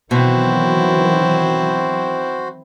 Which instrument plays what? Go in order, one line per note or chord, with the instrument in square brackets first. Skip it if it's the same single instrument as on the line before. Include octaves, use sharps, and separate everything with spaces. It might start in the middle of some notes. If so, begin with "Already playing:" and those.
[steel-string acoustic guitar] B2 [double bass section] D#3 E3 F#3 [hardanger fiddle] C4 E4 [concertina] F#4 C5